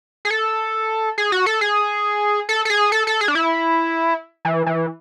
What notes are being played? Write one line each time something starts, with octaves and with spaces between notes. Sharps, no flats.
G#4
A4
G#4
F#4
A4
G#4
A4
A4
G#4
A4
A4
G#4
D4
E4
E3
E3